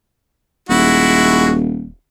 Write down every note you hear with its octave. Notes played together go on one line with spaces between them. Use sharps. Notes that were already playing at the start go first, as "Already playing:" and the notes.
D#1 G#3 E4 F#4